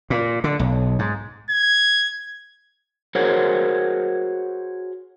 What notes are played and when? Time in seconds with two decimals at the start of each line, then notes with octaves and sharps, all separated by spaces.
0.10 A#2
0.44 D3
0.59 B1
0.99 G#2
1.50 G#6
3.15 F#4 G#4 A#4 C5 C#5 F#5